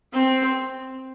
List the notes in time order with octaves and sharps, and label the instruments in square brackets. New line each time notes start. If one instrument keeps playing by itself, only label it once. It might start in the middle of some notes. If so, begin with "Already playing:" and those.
[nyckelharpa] C4